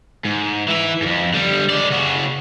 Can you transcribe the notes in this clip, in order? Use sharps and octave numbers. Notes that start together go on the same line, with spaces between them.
G#2
E3 E4
F2 G#2
D3 G3
G#3 D5
C#3 F#4